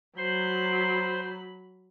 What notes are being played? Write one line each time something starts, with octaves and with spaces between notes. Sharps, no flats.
F#3 C5 B5 C6